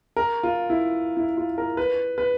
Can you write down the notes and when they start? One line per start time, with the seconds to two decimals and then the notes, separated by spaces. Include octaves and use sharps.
0.16 A#4
0.43 F4
0.70 E4
1.17 E4
1.37 F4
1.58 A#4
1.77 B4
2.18 B4